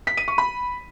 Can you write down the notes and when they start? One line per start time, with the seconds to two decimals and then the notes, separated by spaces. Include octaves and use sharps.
0.07 B6
0.17 D#7
0.28 C#6
0.38 B5